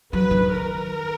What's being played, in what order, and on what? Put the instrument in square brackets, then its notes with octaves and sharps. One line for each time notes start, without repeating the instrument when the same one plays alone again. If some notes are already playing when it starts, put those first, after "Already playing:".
[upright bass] F#3 [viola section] B4
[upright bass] D#3
[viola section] A#4